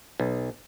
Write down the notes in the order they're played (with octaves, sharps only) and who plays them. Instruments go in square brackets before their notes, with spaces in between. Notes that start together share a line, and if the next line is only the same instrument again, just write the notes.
[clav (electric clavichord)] B1